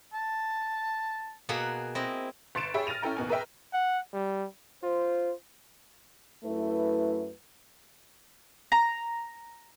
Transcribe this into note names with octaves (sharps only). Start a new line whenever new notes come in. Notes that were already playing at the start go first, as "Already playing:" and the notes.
A5
B2 A#3 G#4 F#5 B5
C4 E4 D#5
G1 C6 A6 C#7 D7 E7
G4 G#4 C#5 E5 G5 B5
F6 A6 A#6 D#7 F7
C#4 E4 A4 G5 A#5
D#2 B2 B3 G#5
G#4 A#4 B4 D#5 E5 G5
F#5
G3
F4 C5
F#2 A3 E4 B4
A#5